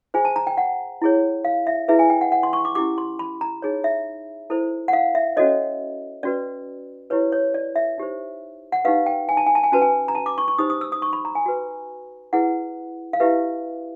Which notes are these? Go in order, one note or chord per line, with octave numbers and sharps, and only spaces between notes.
F4 G#4 C5 G#5
A5
A#5
G5
F#5
E4 G#4 C#5
F5
E5
E4 G#4 B4 E5
G#5
G5
F#5
F#5
C6
C#6
D6
C#4 E4 G4 D6
C6
B5
A#5
D#4 G#4 C#5
E5
E4 A4 C5
F#5
F5
E5
C#4 F#4 A4 C#5 D#5
C#4 F#4 B4 D5
E4 G4 B4 C#5
C#5
D5
E5
D#4 G4 C5
F#5
D#4 G4 B4 F5
G5
G#5
A5
G#5
A5
G#5
C#4 F#4 B4 A5
G#5
A#5
A5
D6
C#6
C#6
D#4 G4 C5 D#6
D#6
E6
D#6
C#6
B5
A#5
G#5
F#4 B4
E4 G#4 B4 F#5
F5
E4 G4 B4 E5